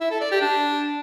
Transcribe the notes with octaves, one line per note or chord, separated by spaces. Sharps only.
E4
A4
D5
G4
D4